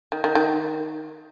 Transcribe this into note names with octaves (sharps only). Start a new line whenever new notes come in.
D#3
D#3
D#3